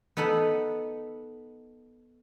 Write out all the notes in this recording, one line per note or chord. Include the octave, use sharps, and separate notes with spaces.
B3 D#4 A4 F#5